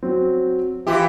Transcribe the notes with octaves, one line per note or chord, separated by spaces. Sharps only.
F#3 C4
E3 F4 G4 E5